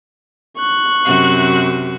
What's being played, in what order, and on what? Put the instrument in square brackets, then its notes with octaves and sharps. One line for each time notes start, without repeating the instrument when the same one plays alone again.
[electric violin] C#6 F#6
[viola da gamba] F#2 C3 F#4